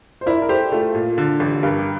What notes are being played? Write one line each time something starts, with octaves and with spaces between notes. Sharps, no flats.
C5
E4 A#4 D5
A#4
G4 A4 C5
A3 F4 A4
A#2
D3
A1
G2 G4 A#4